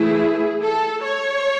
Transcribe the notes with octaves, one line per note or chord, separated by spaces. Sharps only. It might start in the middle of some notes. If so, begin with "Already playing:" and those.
Already playing: E3 A3 E4 G#4
A4
C#5